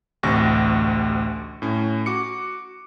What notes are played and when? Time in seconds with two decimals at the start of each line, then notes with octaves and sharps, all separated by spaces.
0.23 A1 D2 C3 C#6 A#6
1.62 A2 C#4
2.06 F#4 D6 C#7